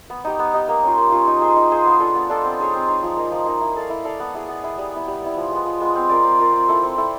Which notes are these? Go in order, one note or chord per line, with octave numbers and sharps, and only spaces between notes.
B3
D#4 G4
B3
D#4 G4
A#3
C#4 F4
A#3
C#4 F4
D#4
G#4 C5
D#4
G#4 C5
B3
D4 F4 A4
B3
D4 F4 A4
C4
D#4 G#4 C#5
C4
D#4 G#4 C#5
F3
A#3 D#4
F3
A#3 D#4
E4
A4 D5 F5
E4
A4 D5 F5
B3
E4 G#4
B3
E4 G#4
G3
B3 E4
G3
B3 E4
F3
G#3 B3
F3
G#3 B3
C4
F4 A#4 D5
C4
F4 A#4 D5
C4
E4 A4
C4
E4 A4